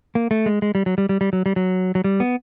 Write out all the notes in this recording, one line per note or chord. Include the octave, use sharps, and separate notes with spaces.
A#3
A3
G#3
G#3
G3
F#3
G3
G3
G3
F#3
G3
F#3
F#3
G3
B3